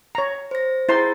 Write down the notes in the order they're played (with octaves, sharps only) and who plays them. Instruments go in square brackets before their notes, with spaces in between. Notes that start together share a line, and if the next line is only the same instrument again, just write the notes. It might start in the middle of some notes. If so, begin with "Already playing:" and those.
[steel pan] C#5 A#5
[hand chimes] C5 A#6
[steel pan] E4 C5 C6 [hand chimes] G#4 A#5 A6